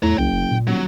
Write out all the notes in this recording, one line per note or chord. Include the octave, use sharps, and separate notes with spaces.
E2 A2 C#5 A#5
F#1 C2 G5
F1
A#2
D#1 F#3